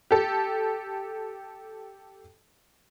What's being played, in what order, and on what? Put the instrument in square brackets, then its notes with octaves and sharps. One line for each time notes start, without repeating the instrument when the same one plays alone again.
[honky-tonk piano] G4 A4